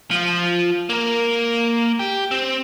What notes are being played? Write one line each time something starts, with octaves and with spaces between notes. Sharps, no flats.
F3 F4
A#3 A#4
G4
C4